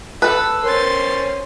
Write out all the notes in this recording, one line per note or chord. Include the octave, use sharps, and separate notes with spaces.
A4 B4 A5 E6 F#6
C#4 A#4 C5 C6 A6